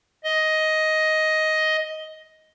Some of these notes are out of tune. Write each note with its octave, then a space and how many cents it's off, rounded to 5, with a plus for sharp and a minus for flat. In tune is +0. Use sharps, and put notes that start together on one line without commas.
D#5 +10